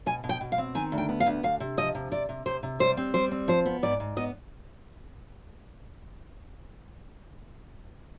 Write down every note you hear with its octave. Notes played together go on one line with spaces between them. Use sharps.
B2 G#5
B2
G5
B2
F5
C4
D#3 G#5
D2
G5
B3
F5
D2
D2 F5
C3
F3 D#5
C3
C3 D5
C3
C3 C5
C3
G3 C5
C4
G3 C5
C4
F3 C5
B3
G#2 D5
G#2
B3 D#5